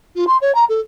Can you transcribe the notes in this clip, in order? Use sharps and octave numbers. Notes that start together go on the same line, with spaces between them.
F4
C6
C#5
A#5
A4